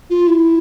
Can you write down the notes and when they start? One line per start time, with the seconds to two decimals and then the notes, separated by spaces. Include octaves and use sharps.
0.10 F4
0.27 E4